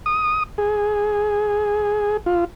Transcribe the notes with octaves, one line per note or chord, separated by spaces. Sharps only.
D#6
G#4
F4